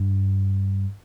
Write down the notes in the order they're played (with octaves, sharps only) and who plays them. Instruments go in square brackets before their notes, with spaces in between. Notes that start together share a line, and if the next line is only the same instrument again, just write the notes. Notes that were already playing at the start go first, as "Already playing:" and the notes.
Already playing: [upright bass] G2